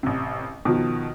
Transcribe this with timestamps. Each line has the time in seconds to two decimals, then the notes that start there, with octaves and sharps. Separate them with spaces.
0.03 A1 C3
0.65 B2 D#3 F3